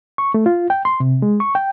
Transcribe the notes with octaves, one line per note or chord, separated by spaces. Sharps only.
C#6
A3
F4
G5
C6
C3
G#3
C#6
G5